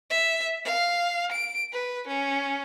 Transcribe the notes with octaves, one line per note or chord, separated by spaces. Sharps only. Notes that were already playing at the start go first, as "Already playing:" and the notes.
E5
F5
D7
B4
C#4